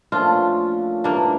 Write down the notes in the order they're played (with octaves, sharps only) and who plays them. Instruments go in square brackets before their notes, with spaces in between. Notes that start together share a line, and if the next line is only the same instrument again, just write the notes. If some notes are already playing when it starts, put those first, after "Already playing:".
[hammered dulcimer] A#2 F3 A3 C#4 [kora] D4 F4
[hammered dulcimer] G2 E3 A3 [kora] A#3 D4